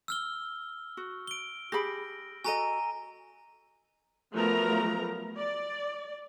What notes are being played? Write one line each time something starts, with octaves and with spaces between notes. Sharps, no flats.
E6 F6 G7
F#4
D7 G7
G4 G#4 B5 A#6
F#4 A4 D#5 G#5 A#5 D#7
F3 F#3 A3 B3 A#4 A#5
D5